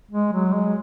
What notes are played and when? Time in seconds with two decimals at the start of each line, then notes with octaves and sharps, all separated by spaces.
0.11 G#3
0.33 F#3
0.53 G#3